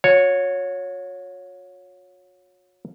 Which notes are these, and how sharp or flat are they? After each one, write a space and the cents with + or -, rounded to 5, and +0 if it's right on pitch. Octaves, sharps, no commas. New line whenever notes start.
F#4 -45 C#5 +0